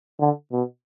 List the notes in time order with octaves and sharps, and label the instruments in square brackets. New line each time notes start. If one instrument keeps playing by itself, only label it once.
[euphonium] D3
B2